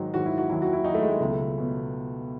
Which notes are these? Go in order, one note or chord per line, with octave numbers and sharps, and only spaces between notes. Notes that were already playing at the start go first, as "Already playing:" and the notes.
Already playing: G#2 D#3 F#3 D#4
G#2 D#3 F#3 F#4
E4
F#4
D#2 D#3 F#3 E4
F#4
E4
D#2 D#3 F#3 D#4
A3
G#3
A3
C#2 B2 F#3
B2 F#3